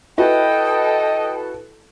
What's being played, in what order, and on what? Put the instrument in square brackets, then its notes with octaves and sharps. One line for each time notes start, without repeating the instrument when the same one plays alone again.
[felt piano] E4 F#4 B4 [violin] A4 [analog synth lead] D#5 [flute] G5